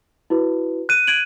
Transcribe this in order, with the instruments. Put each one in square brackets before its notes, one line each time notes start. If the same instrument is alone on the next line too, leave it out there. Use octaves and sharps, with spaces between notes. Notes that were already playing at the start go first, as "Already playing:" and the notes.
[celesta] E4 F#4 B4
[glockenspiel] F#6 D#7
[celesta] G#6 D7 F#7